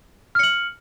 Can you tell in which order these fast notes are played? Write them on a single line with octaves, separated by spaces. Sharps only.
F6 C#7 F#7